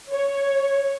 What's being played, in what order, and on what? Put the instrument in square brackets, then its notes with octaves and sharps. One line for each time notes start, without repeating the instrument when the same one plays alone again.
[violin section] C#5